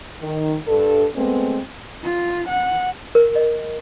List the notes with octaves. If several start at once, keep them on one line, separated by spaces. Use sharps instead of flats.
D#3
G2 A4
G#3 A3 B3 C4
F4
F#5
A#4
D#5